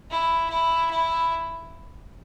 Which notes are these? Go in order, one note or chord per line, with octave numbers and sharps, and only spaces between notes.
E4
E4
E4